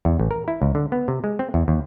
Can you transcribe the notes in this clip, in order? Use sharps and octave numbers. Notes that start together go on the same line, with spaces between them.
E2
A1
A#4
E4
C#2
D3
B3
C3
G#3
C4
E2
D#2